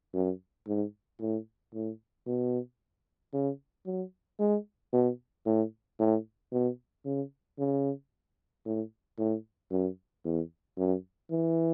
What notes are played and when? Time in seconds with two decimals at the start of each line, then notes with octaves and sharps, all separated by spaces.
0.14 F#2
0.67 G#2
1.20 A2
1.74 A2
2.27 B2
3.33 C#3
3.86 F#3
4.40 G#3
4.93 B2
5.46 A2
5.99 A2
6.52 B2
7.05 C#3
7.59 C#3
8.65 A2
9.18 A2
9.71 F#2
10.25 E2
10.78 F#2
11.31 E3